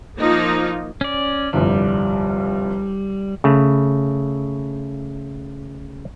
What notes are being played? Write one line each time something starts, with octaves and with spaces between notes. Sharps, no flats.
F3 A#3 D#4 F4
C#4 D5
G1 C2 F2 G3
C#3 A3